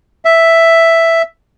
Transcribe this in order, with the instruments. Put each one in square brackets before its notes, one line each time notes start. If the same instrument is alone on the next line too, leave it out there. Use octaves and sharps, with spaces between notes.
[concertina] E5